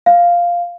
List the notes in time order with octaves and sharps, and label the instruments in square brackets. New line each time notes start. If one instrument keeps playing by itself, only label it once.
[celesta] F5